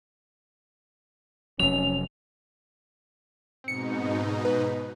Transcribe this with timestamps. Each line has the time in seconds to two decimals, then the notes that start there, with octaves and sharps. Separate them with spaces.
1.59 F1 F#3 C#4 F7
3.64 G#2 B2 C4 D#4 C#7
4.45 B4